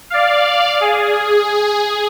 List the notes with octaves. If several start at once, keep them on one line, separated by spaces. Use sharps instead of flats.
D5 F5
G#4